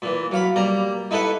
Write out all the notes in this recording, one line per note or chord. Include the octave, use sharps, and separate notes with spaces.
A#2 E3
F#3 F5 B5
G3 A#3 A#5
D#4 E4 A4 B4 F#5